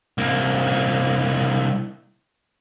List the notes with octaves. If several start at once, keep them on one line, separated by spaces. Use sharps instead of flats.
C2 A#3